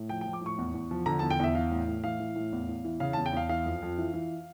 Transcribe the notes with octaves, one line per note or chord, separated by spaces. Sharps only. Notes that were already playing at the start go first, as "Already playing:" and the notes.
Already playing: A2
F3 G5
F3 G5
D6
A2 C#6
E2
E2
F3
D3 A#5
E2 A5
G5
E2 E5
E3 F5
A2
A2
E3 F5
E3
A2
E2
E2
E3
C#3 F5
E2 A5
G5
E2 F5
E3 F5
F2
F2
E3
E3